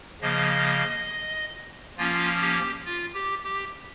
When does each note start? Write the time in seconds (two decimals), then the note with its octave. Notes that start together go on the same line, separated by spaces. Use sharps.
0.21 C#3 F3 A#3 D#5
1.97 F3 A#3 C#4 F4
2.41 G4
2.85 F4
3.14 G4
3.44 G4